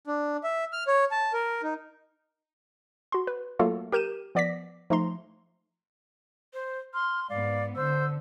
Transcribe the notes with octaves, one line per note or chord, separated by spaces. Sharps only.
D4
E5
F6
C#5
A5
A#4
D#4
F#4 C6
B4
F#3 A3 A#3 F4 F#4 A4
G4 A#4 G6 D#7 E7
F3 B3 D5 D6 A#6 B6
F3 A3 D#4 A#5 C6
C5
C6 F6
G#2 B3 D5 F5
D3 C5 E6